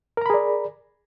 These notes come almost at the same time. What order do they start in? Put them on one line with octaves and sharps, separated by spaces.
A#4 A#5 B5 G#4 D5